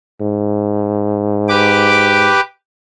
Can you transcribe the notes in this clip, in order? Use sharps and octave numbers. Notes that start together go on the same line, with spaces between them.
G#2
G4 B4 D6